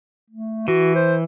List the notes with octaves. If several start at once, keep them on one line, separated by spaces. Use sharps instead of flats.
A3
E3 F#4
C5